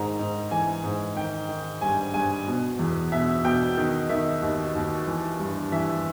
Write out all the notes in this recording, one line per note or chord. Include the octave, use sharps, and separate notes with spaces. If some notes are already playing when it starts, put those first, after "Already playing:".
Already playing: G#2 D#3 A#5
G#2
E3 G#5
G#2
D#3 G5
D#3
G2 G#5
G2 G#5
B2
E2
B2 E5
B2 G5
D#3
D#3 E5
D#2
D#2
E3
G2
E3 E5